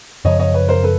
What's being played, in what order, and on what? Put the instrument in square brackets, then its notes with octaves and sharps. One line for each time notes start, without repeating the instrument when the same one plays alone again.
[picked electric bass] F#2 C#3 F3 [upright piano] C#5 D#5
[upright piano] C#5 D#5
B4 C#5
A#4 C5
A4 B4